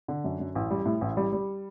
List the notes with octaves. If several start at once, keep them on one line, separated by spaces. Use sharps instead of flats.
D3
F#2
F#2
A1
G3
A2
A1
G3
G3